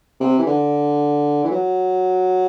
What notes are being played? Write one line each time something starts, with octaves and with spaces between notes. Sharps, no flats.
C3
E3
D3
E3
F#3